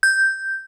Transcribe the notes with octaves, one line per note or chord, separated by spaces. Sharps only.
G6